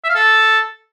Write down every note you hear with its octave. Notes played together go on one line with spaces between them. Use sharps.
E5
F5
A4